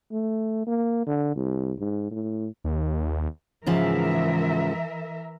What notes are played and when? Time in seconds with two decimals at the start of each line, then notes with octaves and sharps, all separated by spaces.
0.12 A3
0.67 A#3
1.07 D3
1.36 C2
1.79 G#2
2.11 A2
2.64 D#2
3.67 G#2 C#3 E3 F3 A#4 E5